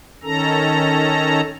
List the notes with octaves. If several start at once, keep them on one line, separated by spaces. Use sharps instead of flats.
D#3 C#4 A4 A#5